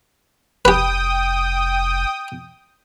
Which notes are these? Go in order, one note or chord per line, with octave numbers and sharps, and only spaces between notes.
F1 G4 B4 G5 D#6